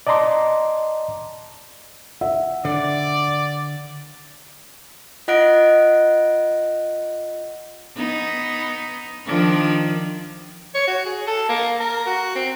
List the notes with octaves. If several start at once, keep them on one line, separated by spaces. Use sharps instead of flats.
D5 D#5 A5 A#5 C6 D6
E5 F#5
D3 D5
F4 D#5 F#5 F#6 A#6 D7
B3 D#4
D#3 F3 D4
C#5
F#4
G#4
A4
A#3
A#4
F#4
C4